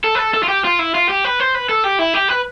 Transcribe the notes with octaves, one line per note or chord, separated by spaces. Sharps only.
A4
B4
A4
A4
F4
G4
F4
E4
F4
G4
B4
C5
B4
A4
G4
E4
G4
B4